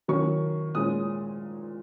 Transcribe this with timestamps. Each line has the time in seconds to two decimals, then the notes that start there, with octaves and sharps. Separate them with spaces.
0.08 D#3 F#3 A#3 C#4 C#6
0.75 A#2 G#3 C#4 D#6